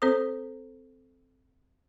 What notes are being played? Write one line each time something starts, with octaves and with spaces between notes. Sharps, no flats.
C4 A4 C5 D#6